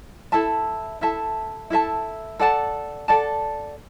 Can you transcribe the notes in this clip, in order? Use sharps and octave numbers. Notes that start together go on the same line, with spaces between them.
E4 A4 E5 A5
E4 A4 E5 A5
E4 A4 E5 A5
A4 D5 F#5 A5
A4 D5 F#5 A5